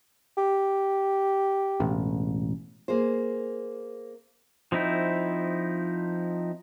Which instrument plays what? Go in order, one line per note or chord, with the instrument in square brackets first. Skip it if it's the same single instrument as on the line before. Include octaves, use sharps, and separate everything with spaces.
[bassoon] G4
[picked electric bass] E1 A1
[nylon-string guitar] A#3 G#4 C5
[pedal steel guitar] F3 C4 D#4 E4